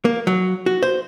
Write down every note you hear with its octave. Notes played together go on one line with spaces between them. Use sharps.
A#3
F#3
F#4
C5